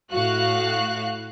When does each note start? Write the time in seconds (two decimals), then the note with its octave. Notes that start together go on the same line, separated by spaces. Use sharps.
0.12 A2 F#4 F5 F#6